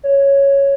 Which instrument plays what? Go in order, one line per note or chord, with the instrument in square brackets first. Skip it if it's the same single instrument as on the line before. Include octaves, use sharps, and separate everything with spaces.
[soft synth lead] C#5